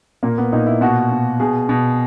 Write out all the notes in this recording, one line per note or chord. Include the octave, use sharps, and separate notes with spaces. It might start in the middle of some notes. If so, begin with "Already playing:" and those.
A#2 A#3
B3
A#2 D#4
E4
B2 F#4
B2
B2 G#4
B2